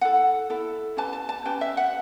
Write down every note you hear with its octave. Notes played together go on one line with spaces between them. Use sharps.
E4 A4 F#5
E4 A4
C#4 G4 B4 A5
A5
A5
C#4 G4 B4 G5
E5
F#5